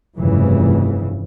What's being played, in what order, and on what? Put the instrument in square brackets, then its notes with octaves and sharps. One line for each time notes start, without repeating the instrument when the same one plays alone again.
[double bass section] F1 G2 C#3 E3